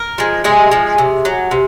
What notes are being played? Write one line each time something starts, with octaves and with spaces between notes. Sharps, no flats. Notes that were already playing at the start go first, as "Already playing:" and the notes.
Already playing: A#4
F3 G#3
C3 G#3 G#4
F3 G#3
C3
F#3
C3